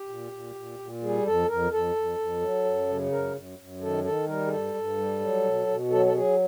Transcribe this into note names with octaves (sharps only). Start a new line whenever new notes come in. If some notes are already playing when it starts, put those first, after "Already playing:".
Already playing: G4
A#2
A#2
A#2
A#2
G3 G#4
F2 A4
F2 A#4
F2 A4
F2
F2
F#3
F#2
C#3
F#2 A#4
F#2
F#2
D#3 A4
D#3 A4
G3 A#4
G#4
G2 A4
G2
G3
F#3
B2
B2
F#3 A4
A4
F#3 G#4